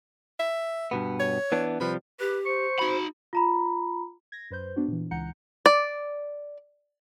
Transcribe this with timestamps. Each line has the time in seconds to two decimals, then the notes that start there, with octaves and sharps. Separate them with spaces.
0.39 E5
0.91 G2 B2 B3
1.19 C#5
1.52 E3 B3 D4
1.80 C3 F3 G3 B4
2.20 G4 B4
2.46 C5 C#6
2.79 D#4 F#4 B5
3.33 F4 A#5 B5
4.32 G#6 A#6
4.51 F#2 B4 C5 G6
4.76 B3 D4 F#4
4.88 A#2 E3
5.11 C#2 E3 F#5 A#5 G6 C#7
5.66 D5